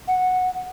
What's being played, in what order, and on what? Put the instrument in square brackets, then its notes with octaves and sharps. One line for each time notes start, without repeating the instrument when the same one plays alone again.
[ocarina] F#5